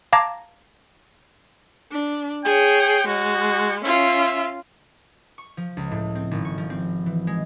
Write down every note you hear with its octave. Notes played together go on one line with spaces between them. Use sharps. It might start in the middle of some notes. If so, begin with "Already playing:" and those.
F5 A5 A#5 D6 G#6 A#6
D4
G#4 C#5 G5
G#3 F#4
C#4 F4 E5
C#6
F3
C#2
A2
C4
G#1
C#6
F3
C4
E3
G#3